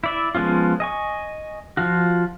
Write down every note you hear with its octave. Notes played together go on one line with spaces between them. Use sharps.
E4 D5 E5
F3 G#3 B3 C#4 F4
D#5 G#5 C#6
F3 F4 F#4